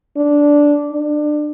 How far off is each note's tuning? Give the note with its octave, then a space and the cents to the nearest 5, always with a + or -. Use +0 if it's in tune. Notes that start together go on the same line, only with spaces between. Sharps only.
D4 -10
D4 +25